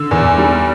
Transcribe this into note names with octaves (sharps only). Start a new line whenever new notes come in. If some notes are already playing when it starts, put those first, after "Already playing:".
Already playing: D3 E6
E2
G3